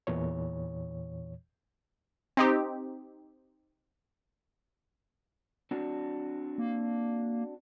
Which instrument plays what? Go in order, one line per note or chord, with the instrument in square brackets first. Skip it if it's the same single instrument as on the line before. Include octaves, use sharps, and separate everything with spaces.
[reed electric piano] E2 A#2 E3 C#5
[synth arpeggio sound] C4 D#4 G4
[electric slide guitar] C4 D4 F#4
[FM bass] A#3